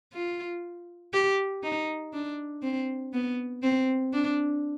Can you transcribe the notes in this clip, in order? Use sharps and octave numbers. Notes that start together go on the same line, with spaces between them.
F4
G4
D#4
D4
C4
B3
C4
D4